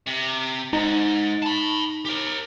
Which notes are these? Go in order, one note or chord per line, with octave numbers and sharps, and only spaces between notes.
C3
G#2 D#4
A5 B5
G4 A#4